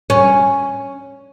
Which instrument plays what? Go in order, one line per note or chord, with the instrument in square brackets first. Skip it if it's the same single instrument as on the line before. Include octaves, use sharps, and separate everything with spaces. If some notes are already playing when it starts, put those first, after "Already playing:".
[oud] C#4